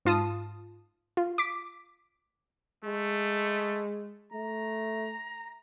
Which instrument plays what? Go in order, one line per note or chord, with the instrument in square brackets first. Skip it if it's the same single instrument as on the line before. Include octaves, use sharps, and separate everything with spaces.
[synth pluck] G#2 F4 A5 D#6
F4
D6 B6
[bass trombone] G#3 [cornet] A3
[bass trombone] A3 [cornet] A#5